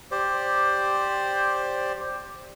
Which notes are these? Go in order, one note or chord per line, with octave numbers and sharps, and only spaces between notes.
G4 C5 D5